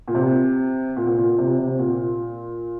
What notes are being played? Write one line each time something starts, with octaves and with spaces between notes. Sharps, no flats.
A#2
C3
A#2
A#2
A#2
C3
C3
A#2